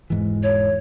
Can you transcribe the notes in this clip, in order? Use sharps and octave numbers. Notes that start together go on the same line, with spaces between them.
E1 G#2 E3
C#5